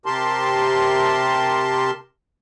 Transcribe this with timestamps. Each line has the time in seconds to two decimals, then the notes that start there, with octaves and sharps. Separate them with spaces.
0.06 C3 G4 A#4 A5 C6